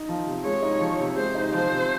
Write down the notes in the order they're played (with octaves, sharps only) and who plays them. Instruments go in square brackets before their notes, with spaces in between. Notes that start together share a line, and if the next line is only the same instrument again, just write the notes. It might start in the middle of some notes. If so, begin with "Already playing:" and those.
Already playing: [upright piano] D#4
F3
C3
[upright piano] G#3 [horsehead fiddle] C#5
[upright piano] D#4
F3
C3
[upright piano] G#3 [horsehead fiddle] C5
[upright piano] D#4
[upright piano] F3 [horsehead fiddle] C5
[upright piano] C3